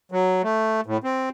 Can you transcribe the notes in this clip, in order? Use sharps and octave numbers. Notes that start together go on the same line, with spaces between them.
F#3
A3
A2
C4